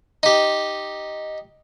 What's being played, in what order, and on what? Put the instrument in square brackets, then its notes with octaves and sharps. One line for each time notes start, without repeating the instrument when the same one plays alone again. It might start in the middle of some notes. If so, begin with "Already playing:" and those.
[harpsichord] D#4 G4